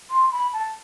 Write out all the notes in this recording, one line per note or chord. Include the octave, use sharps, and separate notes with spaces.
C6
B5
A5